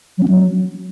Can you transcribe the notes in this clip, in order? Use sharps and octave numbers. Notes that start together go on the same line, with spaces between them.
F#3
C#4
F#3